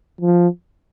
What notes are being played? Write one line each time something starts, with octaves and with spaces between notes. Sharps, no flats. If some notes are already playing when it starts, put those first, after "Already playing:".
F3